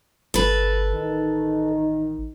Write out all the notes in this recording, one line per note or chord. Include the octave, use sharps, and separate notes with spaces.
G1 A4 B4
A1 D#3 D#4